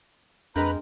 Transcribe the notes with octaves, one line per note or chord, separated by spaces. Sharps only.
F2 G#3 D4 A#4 B4 G5 A#5 B5